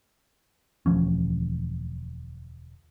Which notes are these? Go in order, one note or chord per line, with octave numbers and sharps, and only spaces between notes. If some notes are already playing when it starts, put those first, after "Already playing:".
E1 D2 F3 C#4